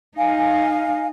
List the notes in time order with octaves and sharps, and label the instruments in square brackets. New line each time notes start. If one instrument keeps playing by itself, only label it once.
[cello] D#4 [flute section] F5 G#5